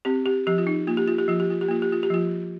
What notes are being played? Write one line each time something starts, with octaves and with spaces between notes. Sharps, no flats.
C4 G4
G4
F3 G4
F4
D#4
A#3 F4
G4
F4
G4
F3 F4
G4
F4
G4
A#3 F4
G4
F4
G4
F3 F4